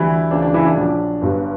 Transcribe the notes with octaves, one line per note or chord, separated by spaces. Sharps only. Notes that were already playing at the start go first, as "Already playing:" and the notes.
Already playing: D2 D3 E3 G3 E4
D2 C#3 E3 D4
D4
E3 E4
D4
A#1 A#2 F#3 D4
G1 G2 F#3